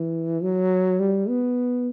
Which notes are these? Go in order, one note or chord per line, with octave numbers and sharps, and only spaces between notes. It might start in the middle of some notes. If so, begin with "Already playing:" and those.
Already playing: E3
F#3
G3
B3